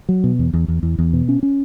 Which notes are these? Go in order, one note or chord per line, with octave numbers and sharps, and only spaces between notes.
F#3
B2
E2
E2
E2
E2
E2
B2
C#4
C#4